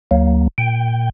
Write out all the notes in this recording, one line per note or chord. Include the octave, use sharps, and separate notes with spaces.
D2 F#3 A#3
A#2 G5